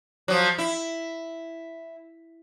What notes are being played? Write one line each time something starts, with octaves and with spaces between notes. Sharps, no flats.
F3 F#3
E4